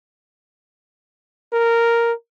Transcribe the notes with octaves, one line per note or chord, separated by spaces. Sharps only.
A#4